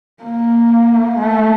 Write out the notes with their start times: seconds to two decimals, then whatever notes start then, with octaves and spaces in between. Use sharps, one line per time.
0.23 A#3
1.18 A3